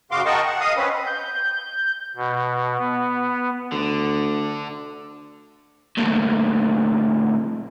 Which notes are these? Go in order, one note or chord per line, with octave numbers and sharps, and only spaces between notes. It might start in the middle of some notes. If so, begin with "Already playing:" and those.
F#2 C#3 F#4 F5 C6 D6
A#4 D#5 F#5 G5 A5 C#6
F#5
D#5 F5 D#6
C4 C#4 B4
G6
B2
B3
D2 D3
D2 A#2